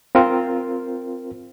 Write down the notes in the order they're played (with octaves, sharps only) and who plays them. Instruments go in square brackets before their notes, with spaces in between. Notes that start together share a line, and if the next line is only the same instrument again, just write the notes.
[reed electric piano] C4 F4 A#4 C5